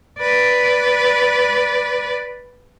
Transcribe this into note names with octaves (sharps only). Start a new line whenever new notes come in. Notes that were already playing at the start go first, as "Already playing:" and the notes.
B4 D5